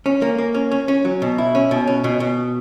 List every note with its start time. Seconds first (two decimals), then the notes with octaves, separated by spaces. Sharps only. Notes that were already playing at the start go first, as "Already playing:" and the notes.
0.06 C#4
0.22 A#3
0.38 A#3
0.54 C#4
0.72 C#4
0.88 C#4
1.05 F#3
1.22 B2
1.38 E4
1.55 C#4
1.71 B2
1.88 C#4
2.04 B2
2.20 B2